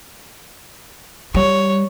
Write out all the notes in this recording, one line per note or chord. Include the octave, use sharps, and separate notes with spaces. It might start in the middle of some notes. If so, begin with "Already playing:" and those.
G3 C#5